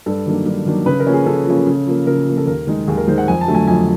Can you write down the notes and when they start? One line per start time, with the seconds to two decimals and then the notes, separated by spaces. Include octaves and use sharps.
0.06 G2 A4
0.26 D#3 F#3 A#3 D4
0.46 G2
0.66 D#3 F#3 A#3 D4
0.86 C#3 B4
1.00 A#4
1.07 F3 A#3 C#4
1.13 G#4
1.26 C#3 A4
1.47 F3 A#3 C#4
1.67 C#3
1.87 F3 A#3
2.07 C#3 A#4
2.27 F3 A#3
2.37 A4
2.47 D#2 A#4
2.67 D#3 G#3
2.88 D#2 G#4
2.98 A#4
3.07 D#3 G#3 C5
3.18 F#5
3.28 F2 G#5
3.41 A5
3.48 D3 F#3 A3
3.54 G#5
3.67 F2 G#5